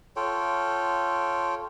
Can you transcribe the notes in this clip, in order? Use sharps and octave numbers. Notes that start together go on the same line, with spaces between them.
F4 A4 C#5 G5